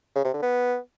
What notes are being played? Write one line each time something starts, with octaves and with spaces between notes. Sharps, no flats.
C#3
C3
D3
B3